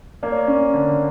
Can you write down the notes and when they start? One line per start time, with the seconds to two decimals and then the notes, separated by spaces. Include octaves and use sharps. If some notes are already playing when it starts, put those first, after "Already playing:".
0.23 A#3 D5
0.31 C#5
0.38 D5
0.47 C#4
0.74 D3